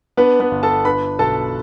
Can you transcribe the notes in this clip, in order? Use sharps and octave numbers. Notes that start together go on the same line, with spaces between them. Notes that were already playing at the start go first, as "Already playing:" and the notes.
B3 D4 B4
B3 B4
G1
A4 A5
D4 B4 B5
B1 A4 A5